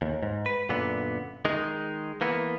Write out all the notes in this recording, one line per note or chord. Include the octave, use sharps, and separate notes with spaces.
D#2
G#2
B4
F#2 A#2 D3 B3
D#3 G#3 D#4
E3 A#3 B3